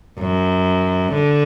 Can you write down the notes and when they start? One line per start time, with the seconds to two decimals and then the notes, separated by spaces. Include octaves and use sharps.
0.19 F#2
1.13 D3